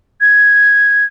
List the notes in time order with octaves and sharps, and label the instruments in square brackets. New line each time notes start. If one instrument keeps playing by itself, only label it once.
[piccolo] G#6